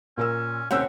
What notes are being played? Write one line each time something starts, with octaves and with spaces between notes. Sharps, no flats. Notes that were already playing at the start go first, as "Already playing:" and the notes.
A#2 C#4 A#4 E6
D#2 C3 C#4 F#5 G5 E6 F#6